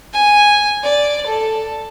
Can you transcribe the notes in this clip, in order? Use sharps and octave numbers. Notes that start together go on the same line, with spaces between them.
G#5
D5
A4